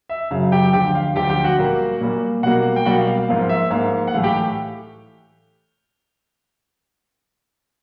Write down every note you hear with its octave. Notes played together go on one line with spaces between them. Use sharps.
E5
F#2 C#3 F#3 F5
G4 G5
D2 D3 F3 G4 G5
F5
D2 D3 F3 G4 G5
G4 G5
F#4 F#5
A#2 G3 A#3
A#2 G3 A#3
B2 G3 A#3 F#4 F#5
G5
B2 G3 A#3 F#4 F#5
F5
F5
F5
G#2 F3 A#3 F5
E5
G#2 F3 A#3 F5
F#5
A2 E3 A3 F5
G4 G5